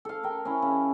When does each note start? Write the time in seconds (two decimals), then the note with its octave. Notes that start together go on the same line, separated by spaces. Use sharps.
0.05 A4 F5
0.23 A#4 G5
0.45 C#4 E4
0.62 C#3